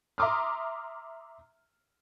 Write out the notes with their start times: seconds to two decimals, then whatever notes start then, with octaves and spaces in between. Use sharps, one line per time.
0.18 E5 A#5 C6 D6 D#6 F6